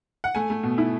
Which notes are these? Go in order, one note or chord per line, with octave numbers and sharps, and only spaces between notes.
F#5
A3 G#5
A3
B2
E4